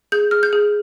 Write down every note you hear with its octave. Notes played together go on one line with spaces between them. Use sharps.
G#4 G6
G#4 F6
G6
G#4